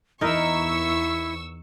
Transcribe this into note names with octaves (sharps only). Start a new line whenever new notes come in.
E2 D#4 E4 A#4 C#6 E6